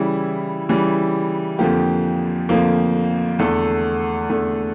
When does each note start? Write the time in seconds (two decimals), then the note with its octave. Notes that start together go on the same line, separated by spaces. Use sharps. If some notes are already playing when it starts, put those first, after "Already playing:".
Already playing: C#3 E3 G3 E4
0.69 C#3 E3 G3
1.59 F2 D3 F3 A#3 G4
2.49 F2 D3 F3 A#3
3.39 E2 D3 A3 A4
4.30 E2 D3 A3